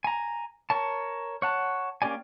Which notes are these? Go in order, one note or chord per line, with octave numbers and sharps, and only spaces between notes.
G#5 A#5
A#4 C#5 A5
C#5 F#5 A5
A#3 C#4 G4 D5 G#5